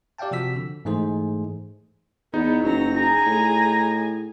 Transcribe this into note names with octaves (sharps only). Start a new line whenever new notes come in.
G4 D5 E5 F5 G5 A5
C3 F3 F#4 E6 B6
D3
G#2 E3 A3 D#4 G#4 C5
E2 B3 D#4
F#1 F#3 A#5
G#4 G#5 A#5
A2